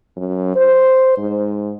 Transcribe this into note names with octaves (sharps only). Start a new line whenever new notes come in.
F#2
C5
G#2